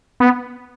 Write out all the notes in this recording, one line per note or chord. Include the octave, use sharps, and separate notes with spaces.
B3